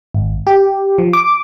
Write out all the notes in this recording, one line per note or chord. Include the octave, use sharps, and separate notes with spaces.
G#1
G4
F3
D6